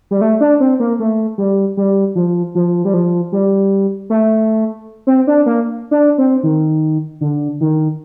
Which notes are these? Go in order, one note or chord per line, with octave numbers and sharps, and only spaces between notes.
G3
A3
D4
C4
A#3
A3
G3
G3
F3
F3
G3
F3
G3
A3
C4
D4
A#3
D4
C4
D#3
D3
D#3